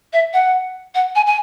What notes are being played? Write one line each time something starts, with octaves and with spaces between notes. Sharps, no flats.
E5
F#5
F#5
G#5
G#5